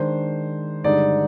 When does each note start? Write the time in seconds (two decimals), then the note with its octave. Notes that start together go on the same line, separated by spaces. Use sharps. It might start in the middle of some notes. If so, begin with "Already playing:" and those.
Already playing: D#3 G#3 D4 C5
0.84 G2 D3 G#3 D#4 D5